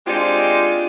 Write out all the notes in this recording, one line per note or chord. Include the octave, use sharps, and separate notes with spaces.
G#3 C4 D4 D#4 F4 G4